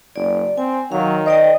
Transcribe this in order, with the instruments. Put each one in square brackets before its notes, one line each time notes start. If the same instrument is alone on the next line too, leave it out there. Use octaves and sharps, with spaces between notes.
[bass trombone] F#1 [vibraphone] D5
[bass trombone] C4 [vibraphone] G#5
[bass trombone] D#3 [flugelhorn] F#3 [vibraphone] F5
[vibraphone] C5 D5 G5 [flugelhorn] D#5